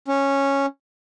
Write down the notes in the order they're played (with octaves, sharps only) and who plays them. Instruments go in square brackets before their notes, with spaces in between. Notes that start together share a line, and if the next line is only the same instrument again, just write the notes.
[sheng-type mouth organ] C#4